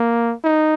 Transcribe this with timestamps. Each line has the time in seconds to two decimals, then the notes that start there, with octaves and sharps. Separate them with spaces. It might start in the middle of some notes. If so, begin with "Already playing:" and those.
Already playing: A#3
0.44 D#4